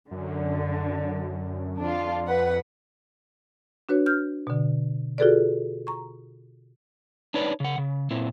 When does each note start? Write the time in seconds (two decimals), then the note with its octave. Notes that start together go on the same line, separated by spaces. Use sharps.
0.11 F#2 D3
1.79 F2 D4 F4
2.26 B4 F#5
3.89 D4 F#4 B4 C#5
4.06 F6 G6
4.47 B2 D3
5.18 F4 F#4 G#4 A4 B4 D5
5.87 A#5 C#6
7.34 D4 D#4 B4 C#5 D5
7.60 C#3 F#5
7.78 C#3
8.11 A#2 C4 E4